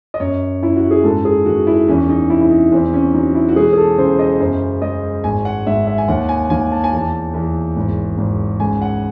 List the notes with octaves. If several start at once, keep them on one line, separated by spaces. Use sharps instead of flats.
D#5
F#2 C#5
F#2 E4
F#4
G#4
G#2 A4
G#4
D#3 F#4
E4
E2 C#4
D#4
C3 E4
E4
D#4
E2 C4
C#4
F#3 D#4
E4
F#4
E1 G#4
G#4
A4
C#3 C5
D#5
F#2 C5
G#3 D#5
G#1 G#5
F#5
G#2 E5
E5
G#5
D#2 F#5
G#5
D#2 G#5
A5
G#5
E2 A5
E2
G#1
G#1
C#2 G#5
F#5